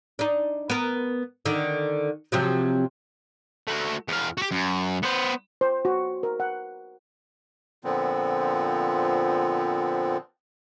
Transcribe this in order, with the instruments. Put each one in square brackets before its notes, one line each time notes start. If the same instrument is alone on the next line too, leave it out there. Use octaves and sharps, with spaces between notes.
[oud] D4 D#4
B3 A#4
D3 D#3
C3 F3 F#3
[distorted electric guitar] A3 F#4
E2 F5
F#4 G4
F#2
B3 C5
[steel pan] C5
F#4
A#4
F#5
[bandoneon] A#2 D3 F3 B3 C4